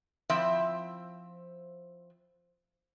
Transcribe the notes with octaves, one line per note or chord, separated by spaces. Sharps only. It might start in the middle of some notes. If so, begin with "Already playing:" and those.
F3 C4 E4 E5